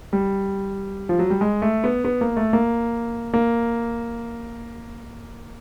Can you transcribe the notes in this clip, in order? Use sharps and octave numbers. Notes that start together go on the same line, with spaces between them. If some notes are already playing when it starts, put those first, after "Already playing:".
G3
F3
F#3
G3
G#3
A3
B3
B3
A#3
A3
A#3
A#3